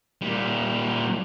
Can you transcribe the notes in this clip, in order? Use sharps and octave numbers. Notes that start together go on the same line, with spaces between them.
A#2 G3